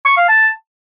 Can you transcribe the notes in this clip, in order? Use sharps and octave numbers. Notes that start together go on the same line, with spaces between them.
C#6
F5
A5